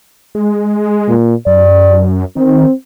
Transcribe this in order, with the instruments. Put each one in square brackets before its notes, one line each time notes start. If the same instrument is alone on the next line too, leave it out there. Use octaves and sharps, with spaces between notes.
[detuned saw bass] G#3
[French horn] A#2
[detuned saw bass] F#2 [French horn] D5
[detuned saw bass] D#3 [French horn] C4